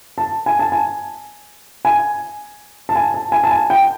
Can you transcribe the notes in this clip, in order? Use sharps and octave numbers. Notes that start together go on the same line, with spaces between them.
A5
G#5
A5
G#5
G#5
A5
G#5
A5
G#5
A5
G#5
G5